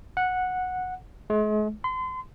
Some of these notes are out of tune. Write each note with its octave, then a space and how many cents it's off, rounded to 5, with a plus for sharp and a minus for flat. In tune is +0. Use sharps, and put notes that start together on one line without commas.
F#5 -10
G#3 +40
C6 -35